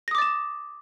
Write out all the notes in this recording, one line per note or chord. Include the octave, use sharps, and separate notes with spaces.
D6 D#6 A6 A#6 E7